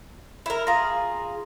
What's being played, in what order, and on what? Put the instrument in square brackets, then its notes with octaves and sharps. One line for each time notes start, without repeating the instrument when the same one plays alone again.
[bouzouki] E4 A#4
[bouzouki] F4 G#4 [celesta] F5 A#5 A#6